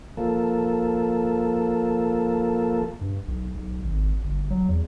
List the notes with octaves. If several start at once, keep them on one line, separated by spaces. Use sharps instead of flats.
F3 A#3 A4
G2
B1
B1
G#1
G1
F#3
E2